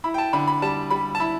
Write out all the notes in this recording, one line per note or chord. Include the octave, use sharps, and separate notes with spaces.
E4 B5
G5
A5
D3 B5
B5
G3 A5
G3 B5
A5
E4 B5